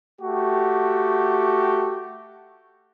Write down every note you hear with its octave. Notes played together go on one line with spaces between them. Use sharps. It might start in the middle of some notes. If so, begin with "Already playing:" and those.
A3 F#4 G4